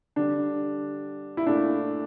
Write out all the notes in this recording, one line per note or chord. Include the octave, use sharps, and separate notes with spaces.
D3 G3 D4
E4
A#2 A3 D4